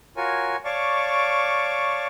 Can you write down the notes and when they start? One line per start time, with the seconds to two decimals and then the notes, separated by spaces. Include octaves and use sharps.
0.17 F4 F#4 A#4 C#5 G#5
0.65 C#5 D5 F5 A5 C#6 D6